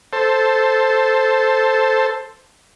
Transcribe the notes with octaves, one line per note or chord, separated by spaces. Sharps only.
A4 C5